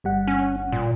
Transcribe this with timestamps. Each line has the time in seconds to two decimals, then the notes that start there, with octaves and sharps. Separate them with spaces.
0.04 G1 G3 F#5
0.28 C#4
0.72 A#2